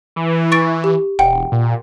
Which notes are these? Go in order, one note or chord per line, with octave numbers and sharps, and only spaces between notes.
E3
C#6 A6 D7
G4
E1 F#5 G5
A#2